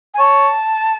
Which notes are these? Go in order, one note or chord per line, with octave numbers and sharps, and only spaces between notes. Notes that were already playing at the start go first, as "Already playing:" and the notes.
G#5
C#5 A5